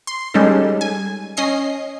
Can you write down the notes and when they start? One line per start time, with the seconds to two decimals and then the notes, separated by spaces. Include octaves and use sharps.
0.07 C6
0.34 G3 G#3 C#4 D#4 A4
0.81 G#5
1.37 C#4 D#5 C7